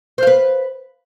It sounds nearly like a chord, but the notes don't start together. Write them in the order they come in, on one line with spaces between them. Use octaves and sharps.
C5 F5 B4